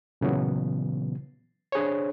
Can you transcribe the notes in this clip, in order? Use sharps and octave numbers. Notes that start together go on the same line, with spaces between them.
A#2 C#3 E3 F#3 B3
D4 G#4 C5 C#5